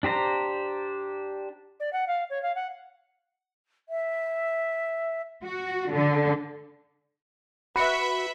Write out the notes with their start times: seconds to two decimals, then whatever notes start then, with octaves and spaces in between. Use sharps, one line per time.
0.03 D4 G4 C5 A#5
1.80 D5
1.93 F#5
2.07 F5
2.30 C#5
2.42 F5
2.55 F#5
3.89 E5
5.43 F#4
5.91 D3
7.76 F#4 B4 E5 B5 C#7